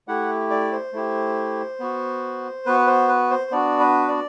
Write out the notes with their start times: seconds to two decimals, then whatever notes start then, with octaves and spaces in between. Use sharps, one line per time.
0.08 A3 E4 G4 F#5
0.51 D5
0.72 C5
0.93 A3 E4 G4
1.80 B3 F#4
2.66 B3 F#4 B4
2.87 C5
3.08 B4
3.31 C5
3.51 B3 D4 F#4 D5
3.80 B4
4.08 D5